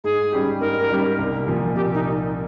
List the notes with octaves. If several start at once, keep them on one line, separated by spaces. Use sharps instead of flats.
G#2 G#4
G3 C#4 G4
G#2 A#4
G3 C#4 G4
C2
A#2 F3
C2 G4
D#4